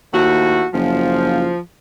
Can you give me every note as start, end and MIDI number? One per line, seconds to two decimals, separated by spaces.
0.13 0.64 39
0.13 0.66 57
0.13 0.66 64
0.13 0.66 66
0.73 1.51 30
0.73 1.58 53